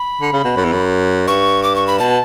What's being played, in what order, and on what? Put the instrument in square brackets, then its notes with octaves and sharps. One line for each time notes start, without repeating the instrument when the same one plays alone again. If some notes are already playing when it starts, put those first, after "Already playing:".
Already playing: [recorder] B5
[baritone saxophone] D3
C#3
B2
F#2
E2
F#2
[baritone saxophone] G2 [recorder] C#6
[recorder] D6
C#6
B5
[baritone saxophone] B2 [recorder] A5